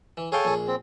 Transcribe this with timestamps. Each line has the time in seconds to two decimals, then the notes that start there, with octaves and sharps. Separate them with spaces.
0.17 E3
0.32 G#4 A4 C#5 F5 G5 G#5
0.45 A#1 G#4
0.67 C4